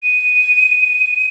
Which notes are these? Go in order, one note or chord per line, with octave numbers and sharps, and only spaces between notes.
D#7